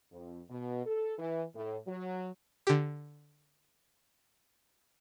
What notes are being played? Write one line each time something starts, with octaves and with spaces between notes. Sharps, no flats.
F2
B2
A4
E3
A2
F#3
D3 G4